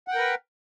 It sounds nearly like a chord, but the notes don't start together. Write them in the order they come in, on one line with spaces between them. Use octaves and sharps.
F#5 G5 A#4 B4